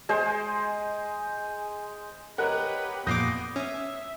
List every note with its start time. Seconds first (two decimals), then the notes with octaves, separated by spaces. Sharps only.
0.09 G#3 C5 G#5
2.38 G4 A#4 B4 C#5 D#5 F#5 F#6
3.07 F2 A#2 B3 D6 D#6 G6 A#6 C7
3.56 C#4 E5